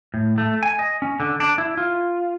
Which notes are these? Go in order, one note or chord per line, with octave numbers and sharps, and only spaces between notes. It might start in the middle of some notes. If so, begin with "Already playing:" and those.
A2
A3
G#5
D#5
C#4
D3
D4
E4
F4